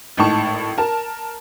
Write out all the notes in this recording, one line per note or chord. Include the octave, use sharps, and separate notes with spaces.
G#1 A2 D#4 A5 C#6
A#4 A5